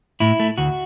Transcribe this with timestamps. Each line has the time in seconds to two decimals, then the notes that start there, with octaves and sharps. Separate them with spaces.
0.20 A2 E4
0.40 A3
0.58 D2 F#4